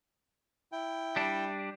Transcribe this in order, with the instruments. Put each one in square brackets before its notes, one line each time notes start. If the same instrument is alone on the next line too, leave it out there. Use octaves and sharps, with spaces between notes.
[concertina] E4 G5
[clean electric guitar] G3 D4